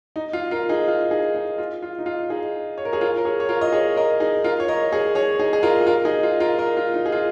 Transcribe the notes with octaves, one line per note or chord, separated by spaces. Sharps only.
D#4
F4
F4 A#4
D#4 G#4
F4
D#4 G#4
D#4
F4
F4
D#4
F4
D#4 G#4
C#5
A#4
G#4 C#5
F4 A#4
A#4
G#4 C#5
C#5
F4 A#4
D#5
G#4 C#5
A#4 D#5
D#4 G#4
F4 A#4
C#5
A#4 D#5
G#4 C#5
G#4 C#5
D#4 G#4
G#4
F4 A#4
G#4
F4 A#4
D#4 G#4
F4
F4 A#4
A#4 D#5
F4
D#4
G#4
F4